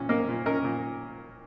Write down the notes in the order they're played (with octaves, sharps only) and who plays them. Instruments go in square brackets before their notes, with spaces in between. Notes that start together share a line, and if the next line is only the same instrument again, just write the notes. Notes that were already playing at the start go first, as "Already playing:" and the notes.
Already playing: [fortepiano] A#2 C#4
A#3 A#4 D#5
A#2
C#4 A#4 D#5
A#2